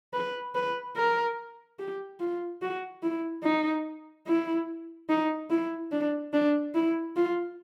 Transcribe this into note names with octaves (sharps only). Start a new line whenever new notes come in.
B4
B4
A#4
G4
F4
F#4
E4
D#4
E4
D#4
E4
D4
D4
E4
F4